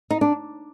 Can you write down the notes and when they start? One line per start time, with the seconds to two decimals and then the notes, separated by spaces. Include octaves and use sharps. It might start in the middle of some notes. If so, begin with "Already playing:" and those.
0.10 D#4
0.21 D4